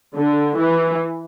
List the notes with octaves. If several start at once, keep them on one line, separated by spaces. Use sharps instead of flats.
D3
E3